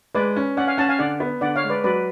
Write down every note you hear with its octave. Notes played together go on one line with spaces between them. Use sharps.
G#3 B4 D5
C#4
C#4 D5 F#5
F5 G#5
C#4 F#5 A5
F5 G#5
D3 D5 F#5
B3
D3 D5 F#5
C#5 F5
G#3
B4 D5
F#3 B4 D5